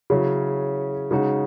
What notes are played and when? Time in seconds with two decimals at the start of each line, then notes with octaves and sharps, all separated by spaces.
0.10 C#3 F#3 C#4 E4
1.11 C#3 G#3 D#4 F#4